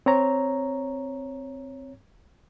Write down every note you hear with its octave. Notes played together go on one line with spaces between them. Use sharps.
C4 C#5 A#5